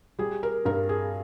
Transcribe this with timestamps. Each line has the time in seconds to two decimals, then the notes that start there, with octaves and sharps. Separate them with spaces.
0.19 G3 G#4
0.43 A#4
0.65 G2 A#4
0.89 G#4